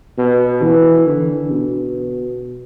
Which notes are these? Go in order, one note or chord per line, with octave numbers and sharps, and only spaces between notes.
B2
E3
D3
B2